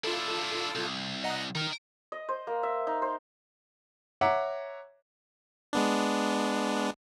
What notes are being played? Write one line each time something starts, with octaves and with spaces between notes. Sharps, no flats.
D4 E4 F4 A4
C2
D#5 F#5 A#5
D#3 D#4 A#4
D#5
C5
A#3
E5
D#4
C5
C#5 E5 F#5 A#5 D6
G#3 B3 D4